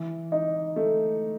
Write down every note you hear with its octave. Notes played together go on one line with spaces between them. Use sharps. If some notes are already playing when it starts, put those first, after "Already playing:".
Already playing: E3
D#4
A3